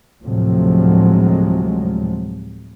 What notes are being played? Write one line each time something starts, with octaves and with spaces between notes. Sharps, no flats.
D2 A2 C3 F3 F#3 G#3